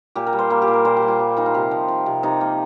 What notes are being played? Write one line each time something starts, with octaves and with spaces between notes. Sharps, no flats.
A#2 G4
A#4
G3
C5
G3 A#3
G4
A#2
A#4
A#2 C5
G4
G3
F4
G3
A#2 D#4
F4
C3 G4
F3
F3
C3
C3 D#4
F3 A#3